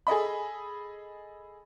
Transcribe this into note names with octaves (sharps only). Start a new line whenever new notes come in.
G#4 A4 D#5 B5